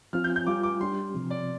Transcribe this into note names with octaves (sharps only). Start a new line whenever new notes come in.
F3 C4 F4 F6
G6
G6
G3 F4 D6
D6
G3 D4 G4 C6
C3 F3 C4
D5